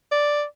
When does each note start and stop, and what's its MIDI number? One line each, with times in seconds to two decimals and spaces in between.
0.12 0.44 74